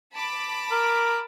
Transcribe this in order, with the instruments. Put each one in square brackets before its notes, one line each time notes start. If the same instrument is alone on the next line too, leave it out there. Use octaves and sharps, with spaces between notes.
[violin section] A5 B5 D6
[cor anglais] A#4